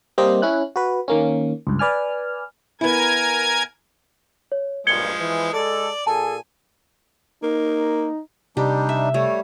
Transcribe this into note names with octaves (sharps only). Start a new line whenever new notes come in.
G3 A#3 C4 G4 C5 D#5
C#4 E4 F#6
F#4 B4
D#3 A#3 C#4
C#2 G2
B4 D5 G#5 F6
B3 E4 A#4 G#5 G#6
C#5
B1 G2 A#2 F3 G#3 G#6 C#7 G7
E3
G#3 A4 D5
A#2 G#4 A4 G#5 A5
A#3 D#4
C3 G3 D4 D#4 G4
E5
G3 A3 C#5